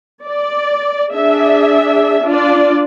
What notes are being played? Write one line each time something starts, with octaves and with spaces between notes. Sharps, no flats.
D5
D4 G#4 E5
D4 F4 D5